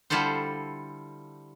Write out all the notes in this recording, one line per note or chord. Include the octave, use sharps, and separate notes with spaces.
D3 G3 E4 F4 A4 C5